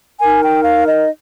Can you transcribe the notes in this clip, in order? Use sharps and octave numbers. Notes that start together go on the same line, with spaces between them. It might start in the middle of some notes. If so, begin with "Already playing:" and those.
D#4 A#4 G#5
G5
F5
D#5